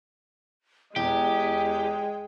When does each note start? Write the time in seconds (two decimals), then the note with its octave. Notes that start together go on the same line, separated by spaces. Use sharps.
0.96 E2 G#3 G4 G5